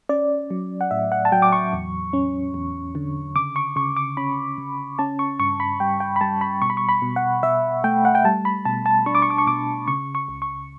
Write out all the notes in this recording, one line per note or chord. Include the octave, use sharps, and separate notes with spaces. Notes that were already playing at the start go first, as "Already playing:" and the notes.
C#4 D5
F#3
F#5
A2 E5
F#5
A5
F#3 G5
D6
C#6
E2
C#4
E2
D3
C#3 D6
C#6
C#3 C#6
D6
C#4 B5
C#3
C#4 A5
C#6
G2 C#6
B5
G3 G5
G5
B5
G3 A5
B5
B2 C#6
B5
C#6
B5
B2
F#5
B2 E5
A3 G5
F#5
G5
G3 A5
B5
B2 A5
A5
D4 C#6
D6
C#6
D6
C#6
B2 D6
C#3 C#6
C#6
C#2
C#6